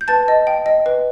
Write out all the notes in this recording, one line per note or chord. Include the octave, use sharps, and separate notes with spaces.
G6
B4 A5 A6
D#5
G5
D#5
B4